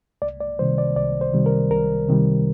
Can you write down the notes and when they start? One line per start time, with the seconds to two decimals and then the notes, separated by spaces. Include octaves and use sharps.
0.22 C2 D5
0.40 D5
0.59 C3 D#3 G3 C5
0.78 D5
0.96 C2 D5
1.21 C5
1.34 C3 D#3 G3
1.46 A#4
1.71 C2 A#4
2.09 C3 D#3 G3